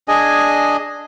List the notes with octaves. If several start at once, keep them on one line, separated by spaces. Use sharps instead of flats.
D4 G#4 D#5 G#5